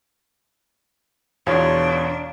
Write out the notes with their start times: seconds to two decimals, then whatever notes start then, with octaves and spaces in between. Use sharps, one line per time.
1.47 E2 B2 D4 F4 C#5